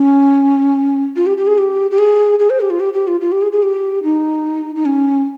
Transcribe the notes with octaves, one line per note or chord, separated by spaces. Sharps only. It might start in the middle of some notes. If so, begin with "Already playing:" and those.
Already playing: C#4
F4
G4
G4
G#4
G4
G4
G#4
G#4
C5
G4
F4
G4
G4
F4
F4
G4
G#4
G#4
G4
D#4
D#4
C#4